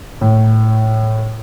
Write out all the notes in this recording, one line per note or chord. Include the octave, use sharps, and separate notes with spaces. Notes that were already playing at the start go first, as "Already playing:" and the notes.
A2